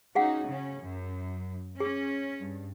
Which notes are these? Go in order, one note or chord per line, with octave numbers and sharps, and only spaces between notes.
C#4 D#4 F#4 G#4 F5 F#5
C#3 C#4
F#2
C#4 G#4
G2